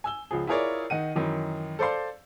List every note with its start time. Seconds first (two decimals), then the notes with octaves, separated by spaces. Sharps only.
0.04 G#5 E6 G7
0.31 C#2 F3 G#4
0.47 E4 F4 G#4 A#4 C#5 D5
0.90 D#3 D#4 F#5 D#7
1.16 F#2 D#3 E3
1.79 A4 C5 D5 F5 C6